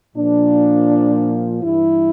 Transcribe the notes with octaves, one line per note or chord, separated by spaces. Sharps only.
A#2 F3 D4
G2 E3 E4